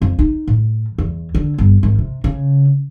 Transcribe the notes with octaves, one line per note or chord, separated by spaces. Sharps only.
F2
D#4
A2
E2
D3
G1
G#1
C3
C#3